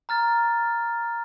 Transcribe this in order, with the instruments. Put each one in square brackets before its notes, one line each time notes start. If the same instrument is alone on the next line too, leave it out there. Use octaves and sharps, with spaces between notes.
[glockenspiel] A#5 F6 A6